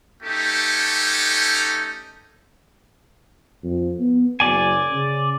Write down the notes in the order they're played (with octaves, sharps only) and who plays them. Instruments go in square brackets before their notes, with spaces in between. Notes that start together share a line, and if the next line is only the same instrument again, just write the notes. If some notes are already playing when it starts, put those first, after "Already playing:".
[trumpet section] A3 C#4 D#4 G4 A4
[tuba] F2
B3
[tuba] F#1 [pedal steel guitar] D5 G#5
[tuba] C#3